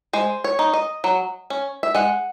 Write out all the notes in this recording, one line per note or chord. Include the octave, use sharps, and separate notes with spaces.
G#3 C5
C#5
D#4
D#5
F#3
C#4
E5
G#3 F#5